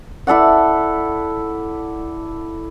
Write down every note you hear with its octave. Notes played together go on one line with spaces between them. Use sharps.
E4 A4 D5 F#5